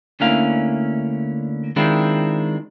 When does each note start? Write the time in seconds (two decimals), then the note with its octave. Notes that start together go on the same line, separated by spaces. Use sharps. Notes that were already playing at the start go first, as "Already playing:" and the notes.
0.20 D2 D3 A#3 C#4 E4 F5
1.76 D#3 G#3 C4 D4 E4 F4